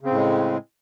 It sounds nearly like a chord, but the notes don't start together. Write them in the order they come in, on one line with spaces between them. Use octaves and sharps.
C#3 C4 A2 G#3